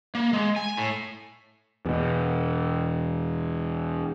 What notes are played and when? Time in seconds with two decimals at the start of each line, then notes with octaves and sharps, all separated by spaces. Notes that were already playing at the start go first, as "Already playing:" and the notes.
0.15 A#3
0.33 G#3
0.56 G#5
0.77 A2
1.85 E2 B2